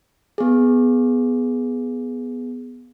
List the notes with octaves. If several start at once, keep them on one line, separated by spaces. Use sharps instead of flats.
B3 G#4